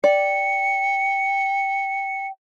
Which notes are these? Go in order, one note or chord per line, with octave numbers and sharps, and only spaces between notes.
D5 G5 C#7